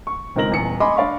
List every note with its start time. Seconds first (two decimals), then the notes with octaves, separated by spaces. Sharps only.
0.07 C#6
0.36 C#2 C4 D#4 A#4 A#6 F#7
0.50 D#1 E2 C#7
0.80 D#5 G#5 B5 C6 D6
0.96 D4 D5 F5 B5 C#6